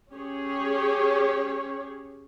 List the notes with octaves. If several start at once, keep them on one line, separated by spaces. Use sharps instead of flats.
C#4 G4 G#4 C#5